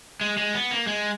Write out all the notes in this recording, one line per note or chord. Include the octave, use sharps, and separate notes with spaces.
G#3
G#3
B3
A#3
G#3